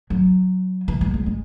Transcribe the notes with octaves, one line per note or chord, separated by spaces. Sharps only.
F#3
E3
G#3
G#3
G#3